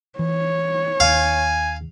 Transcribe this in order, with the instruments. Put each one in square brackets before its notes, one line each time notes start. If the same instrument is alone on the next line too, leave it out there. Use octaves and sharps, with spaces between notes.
[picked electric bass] E3 [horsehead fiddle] C#5
[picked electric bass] D#2 [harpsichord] F5 [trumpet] G#5